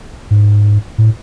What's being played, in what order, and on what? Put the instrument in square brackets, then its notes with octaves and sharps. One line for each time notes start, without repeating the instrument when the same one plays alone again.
[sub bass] G#2
A2